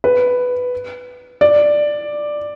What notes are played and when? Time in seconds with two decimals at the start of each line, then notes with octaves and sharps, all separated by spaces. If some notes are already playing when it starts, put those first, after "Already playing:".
0.04 B4
1.41 D5